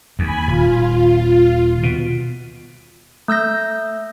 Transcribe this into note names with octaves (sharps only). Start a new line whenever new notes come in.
D#2 G#5 B5
D#1 F4
B2
A3 E6 G6 A#6